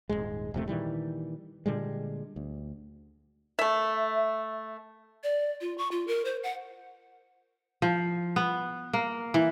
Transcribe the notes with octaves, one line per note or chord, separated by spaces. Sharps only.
D#1 C2 G#2 G#3
E1 C3 A3
A#2 D#3 E3 G3
A#2 D3 G3 G#3
D2
A3 E5
D5
F4
C#6
F4
A#4
C5
F#5
F3
B3
A#3
E3